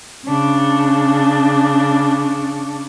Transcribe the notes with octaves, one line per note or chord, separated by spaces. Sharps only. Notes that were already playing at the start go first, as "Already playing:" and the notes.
C#3 D4